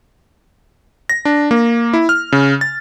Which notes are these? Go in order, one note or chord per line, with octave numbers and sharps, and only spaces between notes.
A#6
D4
A#3
E4
F6
C#3
A6